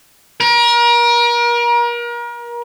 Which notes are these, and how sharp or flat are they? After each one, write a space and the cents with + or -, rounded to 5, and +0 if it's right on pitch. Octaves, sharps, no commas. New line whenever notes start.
A#4 +35